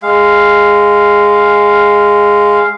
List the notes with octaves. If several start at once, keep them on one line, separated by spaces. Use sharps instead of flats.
G#3 F5